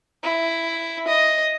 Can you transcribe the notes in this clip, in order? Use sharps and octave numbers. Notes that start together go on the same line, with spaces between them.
E4
D#5